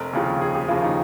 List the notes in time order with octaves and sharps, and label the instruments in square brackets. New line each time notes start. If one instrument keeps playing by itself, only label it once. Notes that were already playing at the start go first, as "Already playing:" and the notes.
Already playing: [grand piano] F1 A#4
D#2 C#3 F3
F1 G#4
G4
D#2 C#3 F3 F4
D#4